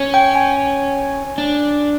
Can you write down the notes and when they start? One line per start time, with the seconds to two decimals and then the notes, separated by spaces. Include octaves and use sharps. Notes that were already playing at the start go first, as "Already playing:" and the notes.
Already playing: C#4
0.14 G5
0.35 G#5
1.38 D4